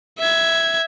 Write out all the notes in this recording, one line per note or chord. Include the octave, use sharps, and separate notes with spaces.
E5 G#6